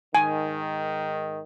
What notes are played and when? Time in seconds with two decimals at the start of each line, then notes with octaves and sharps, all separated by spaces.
0.15 G#2 D#3 G#5